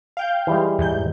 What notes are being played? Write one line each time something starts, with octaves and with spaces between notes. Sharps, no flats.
F5 G5 G6
E3 G3 G#3
E2 G#2 G6